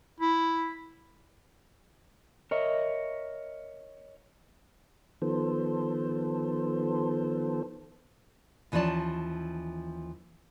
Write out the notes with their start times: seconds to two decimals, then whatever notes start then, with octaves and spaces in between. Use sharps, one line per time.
0.20 E4
2.51 A#4 C#5 D#5 E5
5.22 D#3 F3 B3 A4 C5
8.72 D#2 E3 F3 C#4 D5 A5